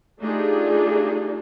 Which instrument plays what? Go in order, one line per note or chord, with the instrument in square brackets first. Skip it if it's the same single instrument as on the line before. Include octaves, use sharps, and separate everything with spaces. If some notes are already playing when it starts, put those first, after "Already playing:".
[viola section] A3 D4 D#4 F4 G4 G#4